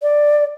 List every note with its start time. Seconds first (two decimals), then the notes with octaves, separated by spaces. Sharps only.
0.03 D5